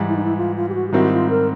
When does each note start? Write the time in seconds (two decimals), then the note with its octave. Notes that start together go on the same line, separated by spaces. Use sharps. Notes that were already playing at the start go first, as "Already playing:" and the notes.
Already playing: G#2 E3 G3
0.09 E4
0.17 D#4
0.24 E4
0.37 F4
0.56 F4
0.69 G4
0.74 F#4
0.88 G4
0.92 G#2 D#3 G3 C4 E4 F#4
1.11 F4
1.30 A#4